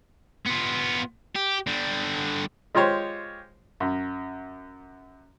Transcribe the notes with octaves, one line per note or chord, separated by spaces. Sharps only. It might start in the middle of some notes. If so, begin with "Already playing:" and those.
B3 F4
G4
D3 G3
G#3 F4 G4 C5 C#5
F#2